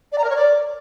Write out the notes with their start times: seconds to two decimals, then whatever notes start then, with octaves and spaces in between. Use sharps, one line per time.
0.12 D5
0.18 A#5
0.24 A#4
0.30 C#5
0.36 D5